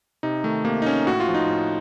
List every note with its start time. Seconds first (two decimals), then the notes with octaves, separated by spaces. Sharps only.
0.23 C3 D#4
0.44 D#3 A3
0.65 C3 A#3
0.82 D#4
0.85 A3 C#4
1.06 A2 F#4
1.20 F4
1.28 F3
1.35 D#4
1.48 A2